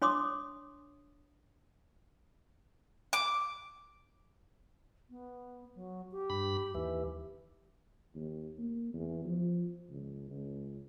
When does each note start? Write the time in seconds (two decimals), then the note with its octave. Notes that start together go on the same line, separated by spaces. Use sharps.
0.02 D4 C#5 C6 D6 D#6
3.13 D6
5.10 B3
5.75 F#3
6.12 G4
6.30 G2 B5
6.75 D#2 E3 G4
8.15 D#2
8.59 A#3
8.94 E2
9.25 F3
9.90 C#2
10.30 C#2